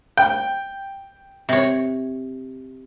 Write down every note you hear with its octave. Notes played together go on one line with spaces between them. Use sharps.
G5
C3 C#5